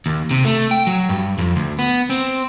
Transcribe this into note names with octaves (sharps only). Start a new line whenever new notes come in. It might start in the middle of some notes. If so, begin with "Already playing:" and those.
D#2
C3
A3
G5
F#3
G2
F2
D2
B3
C4